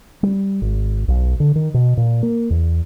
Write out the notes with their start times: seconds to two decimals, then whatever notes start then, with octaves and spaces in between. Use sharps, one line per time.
0.23 G3
0.62 G#1
1.08 B1
1.40 D3
1.55 D#3
1.74 B2
1.97 A#2
2.23 A#3
2.50 E2